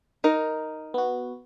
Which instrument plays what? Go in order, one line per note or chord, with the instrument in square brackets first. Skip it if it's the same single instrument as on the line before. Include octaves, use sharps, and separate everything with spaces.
[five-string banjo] D#4 A#4
[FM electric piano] B3 F#4